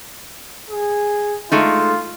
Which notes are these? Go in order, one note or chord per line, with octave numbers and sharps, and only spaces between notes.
G#4
G#3 A3 D#4 F4